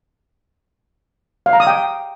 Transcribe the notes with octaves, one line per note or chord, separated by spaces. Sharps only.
F5
A#5
D#6
G5